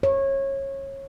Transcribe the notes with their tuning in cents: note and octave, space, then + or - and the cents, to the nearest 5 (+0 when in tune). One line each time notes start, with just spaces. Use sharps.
C#5 -25